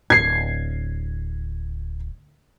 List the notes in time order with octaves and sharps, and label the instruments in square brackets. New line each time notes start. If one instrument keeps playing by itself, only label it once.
[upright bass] D1 [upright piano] G#6 C7